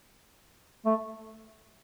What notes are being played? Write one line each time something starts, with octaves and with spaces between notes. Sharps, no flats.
A3